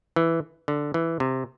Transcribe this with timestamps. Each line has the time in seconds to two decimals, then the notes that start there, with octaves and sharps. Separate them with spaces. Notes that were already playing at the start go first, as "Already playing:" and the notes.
0.16 E3
0.68 D3
0.94 E3
1.20 C3